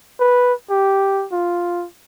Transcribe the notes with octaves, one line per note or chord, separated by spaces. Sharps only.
B4
G4
F4